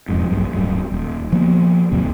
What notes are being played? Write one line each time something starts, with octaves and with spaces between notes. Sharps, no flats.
E1 F2 G#2
A#1 G2 F#3
D1 G2 F#3
D#1
F3 A#3 B3
G#1 D#2 C3 F#3